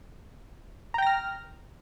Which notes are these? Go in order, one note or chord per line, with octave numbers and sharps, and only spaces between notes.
G5 A#5 F6 A#6